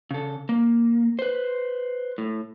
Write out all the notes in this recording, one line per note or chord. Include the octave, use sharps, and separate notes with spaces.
C#3 A4
A#3
B4 C5
A2